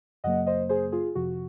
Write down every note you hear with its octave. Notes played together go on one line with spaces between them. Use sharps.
F#2 C#3 F#3 A#3 D#5 F#5
C5 D#5
G#4 C5
F4 G#4
F2 C3 F3 F#4